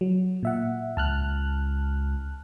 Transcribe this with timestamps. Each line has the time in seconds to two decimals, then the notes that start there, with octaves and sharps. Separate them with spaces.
0.01 F#3
0.43 A#2 E5 F#5
0.97 C#2 A5 F6 F#6